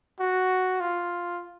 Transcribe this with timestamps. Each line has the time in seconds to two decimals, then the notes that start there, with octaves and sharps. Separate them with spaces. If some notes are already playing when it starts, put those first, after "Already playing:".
0.20 F#4
0.80 F4